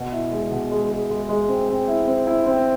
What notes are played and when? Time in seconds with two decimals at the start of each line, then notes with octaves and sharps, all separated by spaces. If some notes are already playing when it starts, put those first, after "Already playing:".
Already playing: B2
0.12 E4
0.31 G#3
0.51 B2
0.71 G#3
0.90 G#3
1.10 G#3
1.29 G#3
1.49 C4
1.69 C4
1.88 E4
2.08 C4
2.27 E4
2.46 C4